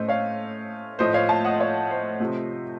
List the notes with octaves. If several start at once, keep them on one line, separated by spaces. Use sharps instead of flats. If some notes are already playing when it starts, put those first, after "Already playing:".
Already playing: A2 A3 C#4 C5 D#5
C#5 F5
A2 F3 A3 C5 D#5
C#5 F5
F5 A5
D#5 F#5
C#5 F5
C5 D#5
C3 F3 A3